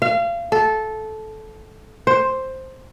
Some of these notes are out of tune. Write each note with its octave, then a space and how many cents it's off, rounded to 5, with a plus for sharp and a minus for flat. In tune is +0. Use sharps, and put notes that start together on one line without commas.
F5 -30
A4 -15
C5 +5